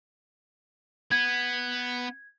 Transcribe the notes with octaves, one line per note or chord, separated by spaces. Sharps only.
B3 G#6